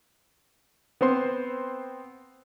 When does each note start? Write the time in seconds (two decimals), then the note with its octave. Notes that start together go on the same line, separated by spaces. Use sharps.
1.01 B3 C4 C5 C6